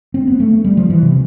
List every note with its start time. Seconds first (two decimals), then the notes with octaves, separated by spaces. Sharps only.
0.14 C4
0.27 B3
0.40 A3
0.64 G3
0.77 F3
0.90 E3
1.03 C3